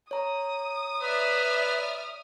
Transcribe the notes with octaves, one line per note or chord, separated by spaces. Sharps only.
C#5 A#5 D#6
B4 D5 E5 F6